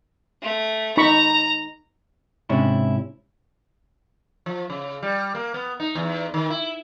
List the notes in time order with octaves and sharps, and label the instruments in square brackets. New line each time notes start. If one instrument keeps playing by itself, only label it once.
[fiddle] A3
[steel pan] D#4 B5 C#6 [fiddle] A#5
[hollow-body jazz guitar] G#2 C3 C#4 D4 E4
[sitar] F3
C#3
G3
A#3
B3
D#4
E2
D#3
E4